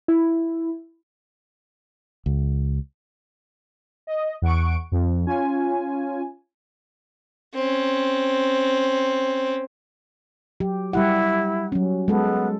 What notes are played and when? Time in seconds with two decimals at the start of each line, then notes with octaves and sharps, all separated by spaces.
0.08 E4
2.26 C#2
4.07 D#5
4.42 E2 F#5 C#6 D7
4.92 F2
5.26 C#4 F4 G#5
7.54 C4 C#4
10.60 F#3 G4
10.93 G3 E4 G4 F#5
11.72 F#3 C#4
12.08 G#3 B3 A4